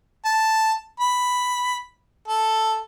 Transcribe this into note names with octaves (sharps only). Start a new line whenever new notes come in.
A5
B5
A4